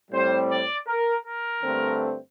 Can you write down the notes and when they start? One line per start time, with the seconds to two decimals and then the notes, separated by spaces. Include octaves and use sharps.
0.10 A2 G3 C4 C5
0.49 D5
0.87 A#4
1.24 A#4
1.63 G2 D3 A3 C4